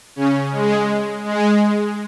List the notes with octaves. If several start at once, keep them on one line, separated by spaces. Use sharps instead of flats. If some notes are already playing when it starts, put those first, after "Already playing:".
C#3 C#4
G#3
G#3